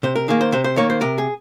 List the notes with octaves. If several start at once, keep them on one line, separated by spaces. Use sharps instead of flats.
C3 C5
A#4
D#3 A#3 G#4
C5
C3 C5
C5
D#3 A#3 C#5
C5
C3 A#4
G#4